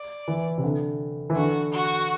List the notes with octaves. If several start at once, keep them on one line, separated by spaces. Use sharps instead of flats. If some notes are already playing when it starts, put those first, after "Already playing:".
Already playing: D5
E3
C3
D3
E3
D3 F#4
F#4